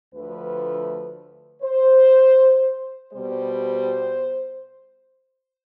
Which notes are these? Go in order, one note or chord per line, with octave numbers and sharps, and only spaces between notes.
D2 D3 F3 A3 B4
C5
B2 G3 C5